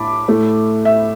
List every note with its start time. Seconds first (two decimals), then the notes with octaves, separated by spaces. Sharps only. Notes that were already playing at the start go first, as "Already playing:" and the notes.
Already playing: A2 A5 B5 D6
0.28 A2 A3
0.85 E5